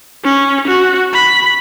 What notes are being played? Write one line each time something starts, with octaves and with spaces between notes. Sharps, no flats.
C#4
F#4
B5